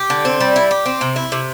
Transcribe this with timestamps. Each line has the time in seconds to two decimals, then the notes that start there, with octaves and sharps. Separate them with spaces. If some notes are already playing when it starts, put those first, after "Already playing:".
Already playing: G4
0.10 D3
0.25 C4
0.40 G3
0.56 E4
0.71 G4
0.86 C4
1.01 C3
1.16 E4
1.32 C3